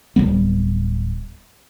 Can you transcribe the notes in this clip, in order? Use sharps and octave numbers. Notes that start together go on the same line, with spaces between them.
D1 F2 G3 B3